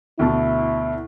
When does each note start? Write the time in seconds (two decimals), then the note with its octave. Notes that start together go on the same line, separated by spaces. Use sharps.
0.19 D2 B2 E4 A5